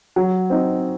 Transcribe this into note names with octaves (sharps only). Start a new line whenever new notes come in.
F#3
C4 D#4